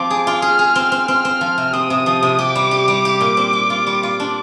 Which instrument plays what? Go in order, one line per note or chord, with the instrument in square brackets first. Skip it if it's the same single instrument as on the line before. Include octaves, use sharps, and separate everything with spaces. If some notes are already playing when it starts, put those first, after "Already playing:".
Already playing: [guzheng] F3 C4 [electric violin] D6
[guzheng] G#4
F4
[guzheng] G#4 [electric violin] F6
[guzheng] G#4
C4
C4
[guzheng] C4 [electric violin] F6
[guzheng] C4
F3
C3
[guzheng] C4 [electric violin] D#6
[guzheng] C3
F3
C3
[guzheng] G4 [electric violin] D6
[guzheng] G3
G4
G3
G4
A#2
C4
G4
F4
G3
F4
D4